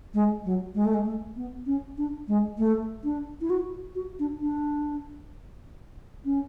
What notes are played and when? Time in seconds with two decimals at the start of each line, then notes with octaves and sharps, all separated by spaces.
0.14 G#3
0.45 F#3
0.75 G#3
0.85 A3
0.94 G#3
1.06 A3
1.36 B3
1.66 C#4
1.98 D4
2.28 G#3
2.58 A3
3.04 D4
3.41 E4
3.50 F#4
3.95 F#4
4.19 D4
4.41 D4
6.25 C#4